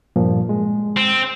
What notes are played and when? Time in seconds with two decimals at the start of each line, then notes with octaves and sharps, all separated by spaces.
0.16 G2 A#2 F3
0.49 G#3
0.97 C4